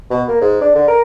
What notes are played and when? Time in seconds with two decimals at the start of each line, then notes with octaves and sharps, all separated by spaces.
0.11 B2
0.28 A#3
0.41 G#2
0.61 D4
0.75 D3
0.88 A#4